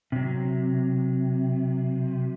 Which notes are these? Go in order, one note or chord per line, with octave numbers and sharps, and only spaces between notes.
C3 F#3